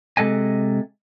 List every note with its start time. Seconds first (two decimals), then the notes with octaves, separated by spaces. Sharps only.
0.17 C3 G#3 A4 D#5 G#5